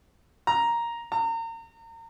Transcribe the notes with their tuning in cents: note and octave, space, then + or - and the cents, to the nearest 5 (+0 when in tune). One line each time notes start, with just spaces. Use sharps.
A#5 +5
A#5 -35